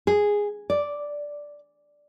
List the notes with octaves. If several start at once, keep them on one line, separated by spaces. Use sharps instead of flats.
G#4
D5